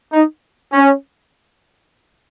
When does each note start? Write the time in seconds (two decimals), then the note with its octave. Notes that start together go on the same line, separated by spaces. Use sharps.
0.13 D#4
0.72 C#4